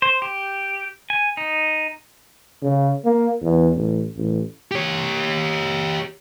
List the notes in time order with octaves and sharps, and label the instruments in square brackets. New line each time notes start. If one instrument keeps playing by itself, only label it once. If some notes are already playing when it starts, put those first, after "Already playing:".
[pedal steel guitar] C5
G4
G#5
D#4
[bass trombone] C#3
A#3
E2
A1
A1
[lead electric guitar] G4 C#5